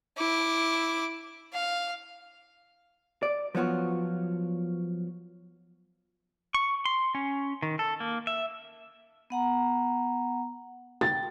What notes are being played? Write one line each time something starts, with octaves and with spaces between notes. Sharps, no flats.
E4 D6
F5
D5
F3 F#3 B3 F4 F#4
C#6
C6
C#4
D#3
A4
A#3
E5
B3 F#5 A#5
G5 A6